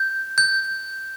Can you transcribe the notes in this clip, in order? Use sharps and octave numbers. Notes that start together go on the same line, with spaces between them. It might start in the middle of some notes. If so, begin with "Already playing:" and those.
Already playing: G6
G6